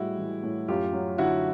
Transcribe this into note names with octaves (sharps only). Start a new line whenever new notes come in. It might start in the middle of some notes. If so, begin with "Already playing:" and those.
Already playing: A2 G3 G#3 E4 F#4
E3
A2
F#2 F4 G4
F#3
D3 E4 F#4